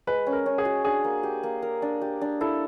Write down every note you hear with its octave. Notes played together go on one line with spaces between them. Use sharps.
G#3 B4
C#4
A#4
C#4
G#4
F#4
D4 G#4
A#3
G4
A#3
A#4
D4
G4
D4
E4 A4